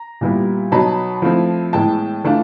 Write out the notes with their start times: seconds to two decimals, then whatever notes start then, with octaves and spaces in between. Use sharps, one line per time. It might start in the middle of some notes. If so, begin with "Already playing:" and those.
Already playing: A#5
0.21 A#2 G3 B3 E4
0.72 B2 F#3 B3 D#4 A5 B5
1.22 F3 A3 C4 E4
1.73 A2 E3 G#3 B3 G5 A5
2.24 E3 A3 D4 F4